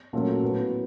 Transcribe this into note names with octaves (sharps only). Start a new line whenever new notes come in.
A#2 F#3 A3 C#4 F4
A2 F#3 B3